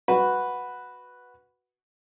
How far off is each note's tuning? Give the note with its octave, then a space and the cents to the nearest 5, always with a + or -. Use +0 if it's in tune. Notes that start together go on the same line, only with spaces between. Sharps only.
F#4 +0 B4 +0